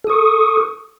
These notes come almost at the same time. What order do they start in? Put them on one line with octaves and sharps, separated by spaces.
A4 D#6 C#6